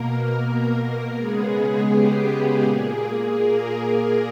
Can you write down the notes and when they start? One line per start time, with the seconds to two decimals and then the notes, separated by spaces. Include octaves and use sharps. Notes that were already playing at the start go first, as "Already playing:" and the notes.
Already playing: B2 A#3 A#4
1.16 C#3 G#3 B3 G#4
1.88 G4
2.60 A#2 A#3 G#4
3.32 A#4